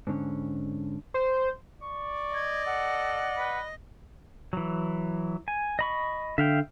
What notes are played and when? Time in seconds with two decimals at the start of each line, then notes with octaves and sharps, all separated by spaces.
0.07 G#2 D3 C#4
1.14 C5
1.82 D5 C#6
2.34 D#5 G#6
2.66 A4 F#5
3.37 B4
4.53 E3 F#3
5.48 G#5
5.79 D#5 B5 C#6
6.38 D3 E5 F5 G5